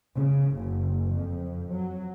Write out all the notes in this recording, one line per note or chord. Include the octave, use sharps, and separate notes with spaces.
C#3
F#1
F2
F#3